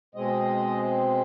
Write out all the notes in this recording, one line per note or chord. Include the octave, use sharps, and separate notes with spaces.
B2 G#3 C4 D#5